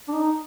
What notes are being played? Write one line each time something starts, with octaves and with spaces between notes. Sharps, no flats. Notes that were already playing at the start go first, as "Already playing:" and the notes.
D4
D#4